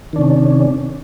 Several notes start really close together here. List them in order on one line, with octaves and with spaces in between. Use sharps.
D#3 D4 C3 C#4